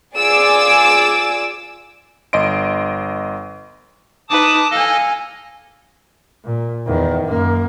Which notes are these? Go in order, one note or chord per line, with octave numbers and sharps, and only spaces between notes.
F4 G#4 D5 G#5 D6 E6
G1 D#5 C6 D7
D#4 B4 A5 D6 D#6
A4 D#5 F5 G#5
A#2
E2 D#3
F#2 A#3